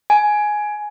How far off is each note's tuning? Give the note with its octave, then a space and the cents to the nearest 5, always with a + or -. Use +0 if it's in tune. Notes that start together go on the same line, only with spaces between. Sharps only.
G#5 +10